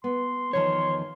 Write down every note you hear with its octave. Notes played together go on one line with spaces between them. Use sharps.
B3 C6
E2 D#3 F3 C#5 C6